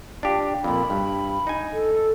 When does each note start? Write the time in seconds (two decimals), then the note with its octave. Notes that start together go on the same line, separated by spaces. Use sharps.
0.23 D4 F4 G4
0.64 F2 A#2 B5
0.90 G2
1.47 D#4 G#5
1.73 A4